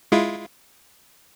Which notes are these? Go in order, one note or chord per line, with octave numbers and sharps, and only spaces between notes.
G#3 E4 F4